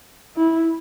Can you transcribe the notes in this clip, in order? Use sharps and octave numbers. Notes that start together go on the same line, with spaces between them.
E4